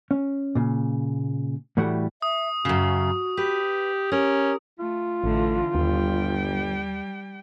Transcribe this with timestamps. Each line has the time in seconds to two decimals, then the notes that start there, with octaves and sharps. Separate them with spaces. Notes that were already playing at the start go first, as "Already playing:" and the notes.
0.11 C#4
0.55 A#2 C#3
1.77 A2 E3 G3 A3 F#4 F#5
2.22 E5 D#6
2.65 F#2 C#3 F#4
3.37 G4 B4
4.12 C#4 G4 A#4
4.80 A3 F4
5.24 A1 D3 E3 A3
5.75 G1 D#2 G3 G5